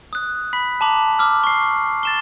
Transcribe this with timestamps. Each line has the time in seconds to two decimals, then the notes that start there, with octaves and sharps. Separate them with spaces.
0.13 D#6 F#6
0.53 B5 B6
0.81 A5 A#5 D6 F#7
1.19 D6 E6 F6
1.44 C#6 C7
2.03 A6 E7 G7